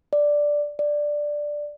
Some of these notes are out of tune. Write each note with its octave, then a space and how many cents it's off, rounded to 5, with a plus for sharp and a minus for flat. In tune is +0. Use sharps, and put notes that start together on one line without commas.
D5 +0
D5 +5